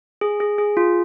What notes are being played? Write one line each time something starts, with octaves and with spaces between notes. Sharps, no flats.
G#4
G#4
G#4
F4